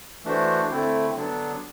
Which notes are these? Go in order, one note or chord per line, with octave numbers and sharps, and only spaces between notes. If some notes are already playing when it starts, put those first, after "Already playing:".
E3 A3 D4 F#4 C5
D3 A3 C4 E4
D3 F#3 B3 D4